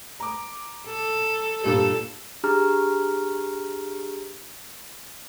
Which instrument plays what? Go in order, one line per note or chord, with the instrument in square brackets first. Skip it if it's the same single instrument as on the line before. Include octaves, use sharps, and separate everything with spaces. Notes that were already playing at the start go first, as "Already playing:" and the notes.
[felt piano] A#5 D6
[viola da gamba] A4
[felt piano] G2 A#2 G3 [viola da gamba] A4
[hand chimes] D4 G4 G#4 A#5 F6